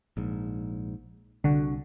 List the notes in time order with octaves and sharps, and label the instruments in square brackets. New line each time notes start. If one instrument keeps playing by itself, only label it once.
[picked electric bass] A#1 G#2
[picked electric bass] C2 [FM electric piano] D3 F#4